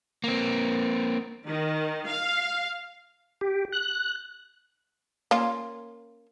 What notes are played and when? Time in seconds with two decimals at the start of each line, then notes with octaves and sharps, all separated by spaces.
0.24 A#3 C4
1.48 D#3
2.08 F5
3.41 G4
3.73 F#6
5.31 A#3 C#4 F4